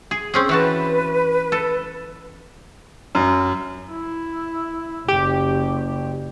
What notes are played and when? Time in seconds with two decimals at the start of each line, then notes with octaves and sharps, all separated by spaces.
0.11 G#4
0.34 C4 C#4 G#4
0.49 E3 F#4 B4 A5
1.52 A4
3.15 F#2
3.92 E4
5.08 F#1 G4